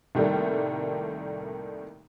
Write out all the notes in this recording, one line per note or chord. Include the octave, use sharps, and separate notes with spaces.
C2 A2 D#3 G3 A3 A#3